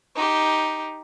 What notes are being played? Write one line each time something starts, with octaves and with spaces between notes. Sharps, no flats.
D#4 G4